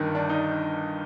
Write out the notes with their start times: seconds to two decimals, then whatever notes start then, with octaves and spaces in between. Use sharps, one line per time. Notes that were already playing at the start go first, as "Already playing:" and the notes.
Already playing: G1 G2 D#3
0.15 D4
0.30 D#4